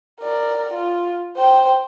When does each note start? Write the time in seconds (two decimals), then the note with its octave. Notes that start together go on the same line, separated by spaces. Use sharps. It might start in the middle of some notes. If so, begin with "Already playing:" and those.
0.21 A#4 D5
0.73 F4
1.36 C5 G5